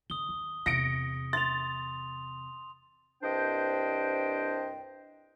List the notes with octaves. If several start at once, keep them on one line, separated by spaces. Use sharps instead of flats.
D3 D#6 G7
D#2
E2 C3 A#6 C#7 D7
C6 A6 F7
C2 G2 D4 C5 D#5 G5